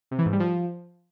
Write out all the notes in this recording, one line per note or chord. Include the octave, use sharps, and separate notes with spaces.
C3
E3
G#2
G3
F3